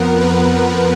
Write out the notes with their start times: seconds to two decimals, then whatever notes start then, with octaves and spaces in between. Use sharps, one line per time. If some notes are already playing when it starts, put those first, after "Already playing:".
Already playing: F2 F3 B3 A#4 F#5
0.21 B4